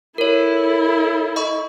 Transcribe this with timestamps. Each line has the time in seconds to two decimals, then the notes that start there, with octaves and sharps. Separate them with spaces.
0.18 E4 A4 A#4 C#5
1.36 D#5 B5 C#6